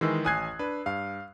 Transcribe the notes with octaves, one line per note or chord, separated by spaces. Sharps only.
D#3 E3 G#3 E6
A1 G#5 D#6 F#6 G#6 C7
D4 B4
G2 F5